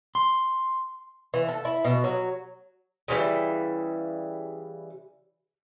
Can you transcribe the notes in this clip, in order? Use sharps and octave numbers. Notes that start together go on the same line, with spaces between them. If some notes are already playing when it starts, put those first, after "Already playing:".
C6
E3
A4
E4
B2
F#3
C#3 E3 F3 G3